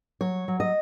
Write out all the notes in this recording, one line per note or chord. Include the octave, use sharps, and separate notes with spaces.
F#3 C#5
F#3
D#5